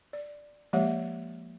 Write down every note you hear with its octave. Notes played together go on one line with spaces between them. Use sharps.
D5
F3 G#3 A#3 G4 C#5 E5